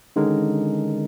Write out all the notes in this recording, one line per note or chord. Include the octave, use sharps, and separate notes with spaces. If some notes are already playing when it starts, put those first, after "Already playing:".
D3 D#3 G#3 C#4 D#4 A#4